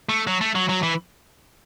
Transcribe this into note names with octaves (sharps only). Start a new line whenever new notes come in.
A3
F#3
A3
F#3
F#3
E3